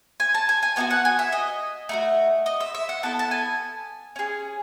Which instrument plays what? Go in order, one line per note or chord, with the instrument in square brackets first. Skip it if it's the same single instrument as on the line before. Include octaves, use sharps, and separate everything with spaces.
[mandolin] G#5
A5
G#5
G#5
B3 D#4 F#4 G#5
F#5
G#5
E5
D#5
A3 D#4 F#4
D#5
E5
E5
F#5
B3 E4 A4 A5
A5
G#5
C#4 G#4